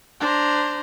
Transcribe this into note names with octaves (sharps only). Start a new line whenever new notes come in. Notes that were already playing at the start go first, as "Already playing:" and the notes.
D4 C5 A#5